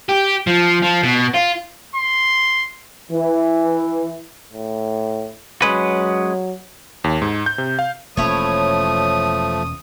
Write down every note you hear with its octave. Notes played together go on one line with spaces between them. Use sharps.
G4
F3
F3
B2
F4
C6
E3
A2
F#3 G#3 C#4 B4
D#2
G#2
G6
C3
F5
E1 F3 A3 A#3 C#4 E4 C#5 D#6